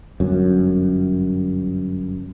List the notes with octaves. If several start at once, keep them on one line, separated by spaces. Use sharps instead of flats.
G1 F#2